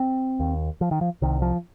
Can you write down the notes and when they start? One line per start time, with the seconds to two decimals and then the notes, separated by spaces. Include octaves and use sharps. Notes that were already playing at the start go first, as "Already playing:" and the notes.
Already playing: C4
0.40 D#2
0.81 F3
0.91 D#3
1.01 F3
1.22 C2 C3 D#3
1.42 F3